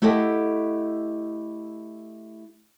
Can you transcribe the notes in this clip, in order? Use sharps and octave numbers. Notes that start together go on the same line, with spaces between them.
A3 E4 G4 A4 D#5 F#5